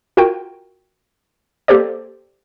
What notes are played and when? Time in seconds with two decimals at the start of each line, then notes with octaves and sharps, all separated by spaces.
0.17 F4 F#4 A#4 G5
1.68 A#3 G4 A4 C5 D5